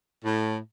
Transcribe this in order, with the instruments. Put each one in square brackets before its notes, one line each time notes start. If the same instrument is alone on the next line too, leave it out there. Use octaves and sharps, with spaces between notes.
[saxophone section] A2